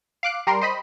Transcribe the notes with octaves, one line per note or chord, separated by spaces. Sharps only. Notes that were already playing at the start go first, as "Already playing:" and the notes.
F5 D6 F#6
G3 A#4 C6
C5 D#5 B5